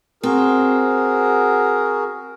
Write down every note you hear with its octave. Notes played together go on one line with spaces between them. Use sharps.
C4 F#4 G#4 A#4